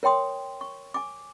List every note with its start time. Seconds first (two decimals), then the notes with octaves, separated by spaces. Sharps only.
0.03 A#4 C#5 G5 C6 D#6
0.61 C#6
0.94 G#5 D6